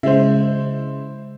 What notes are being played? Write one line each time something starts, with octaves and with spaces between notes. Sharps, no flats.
C#3 G#3 E4 C5